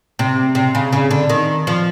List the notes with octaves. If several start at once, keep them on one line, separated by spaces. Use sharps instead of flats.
C3
C3
C#3
C#3
D3
D#3
F3